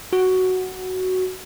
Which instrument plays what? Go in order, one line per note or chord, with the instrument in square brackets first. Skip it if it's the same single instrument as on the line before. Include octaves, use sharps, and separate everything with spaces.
[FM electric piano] F#4